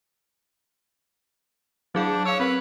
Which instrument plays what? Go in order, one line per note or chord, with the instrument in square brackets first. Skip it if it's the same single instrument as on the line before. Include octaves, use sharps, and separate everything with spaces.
[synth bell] F#3 G#4 F5 [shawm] D4
[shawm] C#5 [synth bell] F5 E6
[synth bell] C4 [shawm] B4